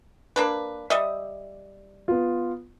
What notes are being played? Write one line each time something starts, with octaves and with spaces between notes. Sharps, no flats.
A#3 D4 B4
G3 D#5 E5
B3 F4